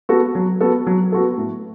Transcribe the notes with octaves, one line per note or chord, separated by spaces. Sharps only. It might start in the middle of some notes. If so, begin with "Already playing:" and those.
B3 F#4 A4
F#3
B3 F#4 A4
F#3
B3 F#4 A4
A2